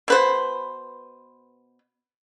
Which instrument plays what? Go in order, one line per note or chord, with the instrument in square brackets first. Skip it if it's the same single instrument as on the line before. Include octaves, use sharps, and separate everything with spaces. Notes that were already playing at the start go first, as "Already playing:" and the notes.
[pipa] B2 B4 C5